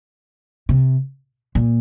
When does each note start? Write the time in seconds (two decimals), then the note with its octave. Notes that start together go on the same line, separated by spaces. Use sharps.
0.69 C3
1.55 A#2